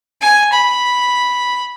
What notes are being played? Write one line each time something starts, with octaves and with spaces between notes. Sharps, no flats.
G#5
B5